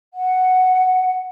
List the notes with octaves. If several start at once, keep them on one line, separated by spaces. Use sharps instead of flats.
F#5